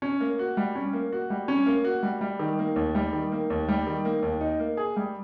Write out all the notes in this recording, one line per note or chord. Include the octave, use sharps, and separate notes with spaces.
C#4
A#3
F#4
G3
C#4
A#3
F#4
G3
C#4
A#3
F#4
G3
G3
D#3
A#3
D#2
G3
D#3
A#3
D#2
G3
D#3
A#3
D#2
D#4
A#3
G#4
G3